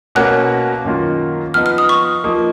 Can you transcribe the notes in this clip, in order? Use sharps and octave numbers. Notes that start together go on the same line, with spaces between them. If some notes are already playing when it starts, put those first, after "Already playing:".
B2 A#3 C#4 F#4 A#4 F#6
F#2 D#3 A#3 F4
F3 B3 D#4 F6
F6
D#6
C#6
F3 A#3 D#4